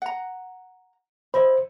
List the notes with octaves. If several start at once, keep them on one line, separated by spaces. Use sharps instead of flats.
F#5 A#5
E4 C5 D#5 B5